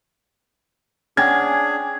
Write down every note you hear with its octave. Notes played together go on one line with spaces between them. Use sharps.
C#4 D4 G#4 F#5 G5 G#6 A#6